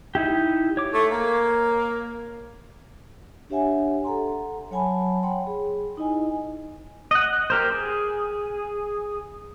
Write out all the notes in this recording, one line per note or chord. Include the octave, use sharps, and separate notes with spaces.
D#4 E4 G4
C#5 D6
A3
A#3
D4 G4 C#5 E5 F#5 G#5
A4 F#5 A#5 C6
F#3 C#5 F#5 G#5 A5 B5
C#5 F#5 G5 B5 C6
G#4
D#4 E4 D#5 G#5
D#5 F#5
G4 A#4 C5
G#4